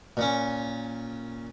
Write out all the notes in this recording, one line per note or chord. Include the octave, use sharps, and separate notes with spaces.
A#2 C#4